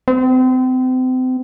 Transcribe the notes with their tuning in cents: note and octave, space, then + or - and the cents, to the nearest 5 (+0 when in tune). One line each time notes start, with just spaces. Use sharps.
C4 -35